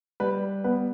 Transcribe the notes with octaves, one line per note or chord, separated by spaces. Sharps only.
G3 B4
B3 B4